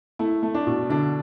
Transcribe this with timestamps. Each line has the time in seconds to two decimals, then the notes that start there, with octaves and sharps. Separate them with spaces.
0.19 A3 E4
0.43 A3
0.55 D4
0.67 B2
0.90 D3 D4